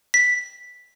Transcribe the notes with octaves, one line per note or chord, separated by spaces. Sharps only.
B6